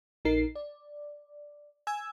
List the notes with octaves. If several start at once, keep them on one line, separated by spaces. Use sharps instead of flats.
A#1 D#4 A#4 C7
D5
G#5 E6 G#6